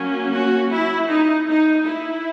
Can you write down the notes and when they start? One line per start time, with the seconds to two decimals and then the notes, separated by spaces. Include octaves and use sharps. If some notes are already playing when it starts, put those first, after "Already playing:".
Already playing: F#3 A#3 C#4
0.33 F#4
0.71 E4
1.09 D#4
1.47 D#4
1.85 E4